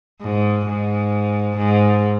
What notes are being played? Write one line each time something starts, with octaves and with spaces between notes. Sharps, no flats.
G#2
G#2
G#2